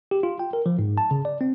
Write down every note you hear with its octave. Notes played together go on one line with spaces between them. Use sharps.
G4
F4
G5
A#4
F3
G#2
A5
C#3
D5
C4